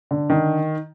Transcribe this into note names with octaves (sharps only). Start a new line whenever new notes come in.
D3
D#3